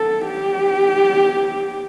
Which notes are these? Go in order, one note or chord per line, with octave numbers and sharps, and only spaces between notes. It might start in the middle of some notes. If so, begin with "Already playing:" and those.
Already playing: A4
G4